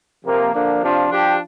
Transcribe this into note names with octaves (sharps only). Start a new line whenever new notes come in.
C3 F3 A#3
D3 F3 A#3 D4
C3 F3 D4 F4
F3 D4 G4